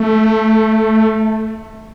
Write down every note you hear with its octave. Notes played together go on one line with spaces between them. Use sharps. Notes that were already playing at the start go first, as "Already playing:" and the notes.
Already playing: A3